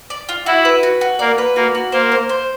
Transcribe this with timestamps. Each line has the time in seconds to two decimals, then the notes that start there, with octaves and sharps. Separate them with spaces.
0.10 D5
0.29 F4
0.46 E4 F#4
0.65 B4
0.83 F#4
1.01 F#4
1.19 A#3 D5
1.38 B4
1.56 A#3 F#4
1.75 F#4
1.92 A#3 C5
2.12 C5
2.29 C5